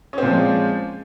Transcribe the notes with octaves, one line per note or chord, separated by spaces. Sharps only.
A#2 F3 G#3 C4 C#4